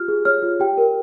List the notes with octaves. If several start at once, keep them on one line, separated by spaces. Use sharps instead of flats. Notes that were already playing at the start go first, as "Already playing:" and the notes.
Already playing: F4 G4 F6
G#4
C#5 F6
F4
G4 G5
A#4